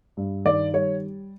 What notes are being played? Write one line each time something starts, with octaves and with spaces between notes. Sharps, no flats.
G2
D#3 D5
G3 C#5